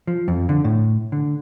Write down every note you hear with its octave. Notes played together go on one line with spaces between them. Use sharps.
F3
F2
D3
A2
D3